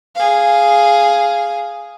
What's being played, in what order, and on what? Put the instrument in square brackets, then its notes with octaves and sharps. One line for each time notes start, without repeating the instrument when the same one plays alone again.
[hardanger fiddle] G#4 F5